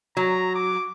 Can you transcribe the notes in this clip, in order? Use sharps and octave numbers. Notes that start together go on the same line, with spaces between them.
F#3 A#5
D6